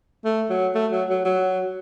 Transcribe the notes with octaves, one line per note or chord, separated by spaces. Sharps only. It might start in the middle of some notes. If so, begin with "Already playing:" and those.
A3
F#3
A3
F#3
F#3
F#3